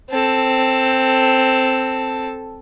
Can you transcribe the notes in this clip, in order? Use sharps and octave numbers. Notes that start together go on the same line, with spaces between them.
C4 A4